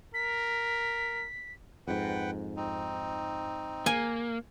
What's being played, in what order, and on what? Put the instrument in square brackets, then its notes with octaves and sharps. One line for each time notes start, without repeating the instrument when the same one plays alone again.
[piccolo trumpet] A#4 [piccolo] B6
[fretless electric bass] F2 G#2 [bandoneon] B4 F#5 G5
[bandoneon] C4 D#4
[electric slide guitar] A#3 [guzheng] G#5